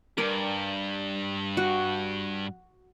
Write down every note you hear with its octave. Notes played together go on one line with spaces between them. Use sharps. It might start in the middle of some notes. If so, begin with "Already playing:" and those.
G2 A#4 D5 G#5
F#4